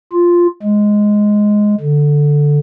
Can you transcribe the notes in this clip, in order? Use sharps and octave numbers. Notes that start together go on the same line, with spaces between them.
F4
G#3
D3